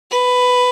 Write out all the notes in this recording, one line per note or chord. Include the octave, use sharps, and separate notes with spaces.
B4